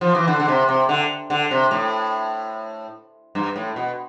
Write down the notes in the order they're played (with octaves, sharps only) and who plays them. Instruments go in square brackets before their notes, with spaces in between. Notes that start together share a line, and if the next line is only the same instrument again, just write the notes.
[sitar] F3
E3
D3
D3
C3
C3
D3
D3
C3
A2
G2
A2
B2